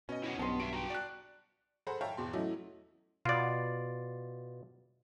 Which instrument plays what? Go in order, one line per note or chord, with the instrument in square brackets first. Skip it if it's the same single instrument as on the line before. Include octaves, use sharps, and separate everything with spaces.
[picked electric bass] B2 [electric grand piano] C#4 D#5
[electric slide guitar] E4 C#5 F#5
[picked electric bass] B1 G2 [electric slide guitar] B3 [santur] A5 C6
[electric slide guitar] F#4 E5 [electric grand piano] D7
[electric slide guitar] F#4 G5 [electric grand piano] A#5
[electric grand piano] D5 F#6
[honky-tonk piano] G#4 A4 C5 F#5 A#5 B5
C#5 E5 F5 G5 A5 A#5
E2 B2 C6
F#3 A3 C#4 E4 D#5
[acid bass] B2 [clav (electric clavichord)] F4 D5